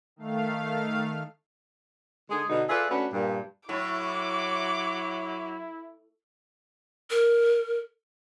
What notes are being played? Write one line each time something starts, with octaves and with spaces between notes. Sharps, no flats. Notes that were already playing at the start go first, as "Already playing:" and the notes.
D#3 A3 F5
D3 G#3 D#4 G#4
B2 D3 D#4
F4 G#4 A4 B4 D5 E5
A3 C#4 D4 F#4 B4
G2 A#2
A2 F#3 E4 D6
A#4